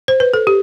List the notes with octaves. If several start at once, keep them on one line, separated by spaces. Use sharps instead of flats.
C5
B4
A4
G4